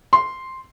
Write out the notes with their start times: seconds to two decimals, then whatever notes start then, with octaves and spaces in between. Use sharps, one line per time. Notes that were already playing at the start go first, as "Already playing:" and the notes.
0.13 C6